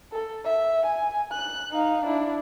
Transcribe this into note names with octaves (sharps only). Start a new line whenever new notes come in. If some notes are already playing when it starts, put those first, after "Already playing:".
A4
E5
G#5
F#6
D#4 F5
D4 E4